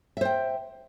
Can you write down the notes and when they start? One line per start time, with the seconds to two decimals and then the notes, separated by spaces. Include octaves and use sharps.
0.17 E5
0.21 C5
0.25 G5